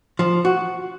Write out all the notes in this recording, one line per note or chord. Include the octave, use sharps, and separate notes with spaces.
F3
F#4